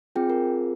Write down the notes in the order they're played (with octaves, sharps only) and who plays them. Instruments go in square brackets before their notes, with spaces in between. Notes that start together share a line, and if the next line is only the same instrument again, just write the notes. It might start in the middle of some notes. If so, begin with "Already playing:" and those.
[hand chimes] C4 F4 G#4 G5
A#4